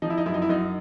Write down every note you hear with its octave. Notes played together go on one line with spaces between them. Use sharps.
F3 D#4
E4
D#4
F#2 E4
D#4
E4
F#2 D#4